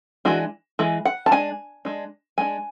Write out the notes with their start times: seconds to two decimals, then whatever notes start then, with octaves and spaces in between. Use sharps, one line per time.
0.25 E3 G#3 D4 F#4
0.79 E3 G#3
1.05 F#5
1.26 A5
1.31 G#3 D4 G#5
1.85 G#3 D4
2.38 G#3 D4 G#5